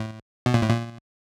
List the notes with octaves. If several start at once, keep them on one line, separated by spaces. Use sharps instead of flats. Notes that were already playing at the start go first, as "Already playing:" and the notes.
Already playing: A2
B2
A#2
A2
A#2